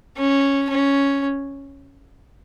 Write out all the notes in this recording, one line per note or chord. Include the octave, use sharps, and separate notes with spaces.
C#4
C#4